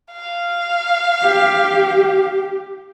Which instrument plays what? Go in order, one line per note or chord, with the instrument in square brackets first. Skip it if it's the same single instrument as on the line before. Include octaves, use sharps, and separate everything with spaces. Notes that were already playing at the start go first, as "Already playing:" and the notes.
[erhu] F5
[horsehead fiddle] G4